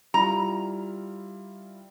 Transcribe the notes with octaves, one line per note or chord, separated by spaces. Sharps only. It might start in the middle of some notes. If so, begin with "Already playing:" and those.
G3 E4 F4 A#5